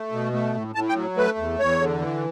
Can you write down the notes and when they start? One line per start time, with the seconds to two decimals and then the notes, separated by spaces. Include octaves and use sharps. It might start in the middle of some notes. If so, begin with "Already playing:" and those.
Already playing: A3
0.12 B2
0.33 A3
0.54 A2
0.75 A2 A5
0.89 G5
0.96 F#3
1.17 A3 B4
1.38 E2
1.59 E2 C#5
1.81 D3
2.01 E3